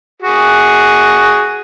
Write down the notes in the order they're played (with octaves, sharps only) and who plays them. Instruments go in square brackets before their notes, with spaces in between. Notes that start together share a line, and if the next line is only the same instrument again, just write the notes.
[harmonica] F#4 G#4